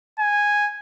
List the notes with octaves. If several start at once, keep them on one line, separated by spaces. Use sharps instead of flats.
G#5